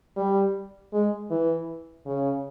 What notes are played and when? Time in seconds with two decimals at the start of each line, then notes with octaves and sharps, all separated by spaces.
0.16 G3
0.93 G#3
1.30 E3
2.06 C#3